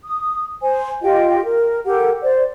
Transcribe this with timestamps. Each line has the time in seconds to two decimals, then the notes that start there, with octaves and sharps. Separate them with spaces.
0.05 D#6
0.62 C5 G#5
1.02 F4 G4 D#5 G5
1.44 A#4
1.85 G4 A4 A#4 F#5
2.22 C5 D5